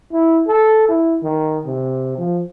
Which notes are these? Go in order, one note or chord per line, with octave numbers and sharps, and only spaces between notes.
E4
A4
E4
D#3
C3
F3